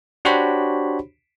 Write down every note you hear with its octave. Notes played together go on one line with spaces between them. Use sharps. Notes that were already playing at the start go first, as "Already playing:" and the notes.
D4 F#4 G4 C5 C#5 B5